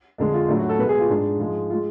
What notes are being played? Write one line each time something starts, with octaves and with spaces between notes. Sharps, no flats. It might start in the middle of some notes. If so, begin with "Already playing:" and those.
F2 D3 G#3 D4
F4
A2 F#3 A3 D4
F#4
A4
B2 G#3 B4
G#4
F4
G#2 G#3 D4
G#2 F3 G#3
G#3 F4